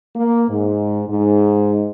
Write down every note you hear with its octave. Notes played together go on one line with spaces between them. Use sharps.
A#3
G#2
G#2